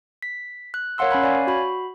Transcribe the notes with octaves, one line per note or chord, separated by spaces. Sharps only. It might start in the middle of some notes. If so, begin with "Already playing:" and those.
B6
F#6
A#4 C#5 F5 F#5 C6 E6
C#4 G#5 B5 F#6
C#5 D5 F5 G#5
F#4 B5